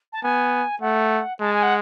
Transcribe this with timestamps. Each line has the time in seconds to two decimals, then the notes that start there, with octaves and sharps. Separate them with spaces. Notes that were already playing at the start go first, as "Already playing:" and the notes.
0.12 A5
0.23 B3 G#5
0.81 A3 F#5
1.40 G#3 A5
1.51 G#5
1.62 F#5